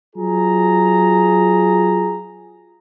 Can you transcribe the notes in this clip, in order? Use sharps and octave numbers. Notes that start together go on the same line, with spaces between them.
F#3 F4 G#4 A#5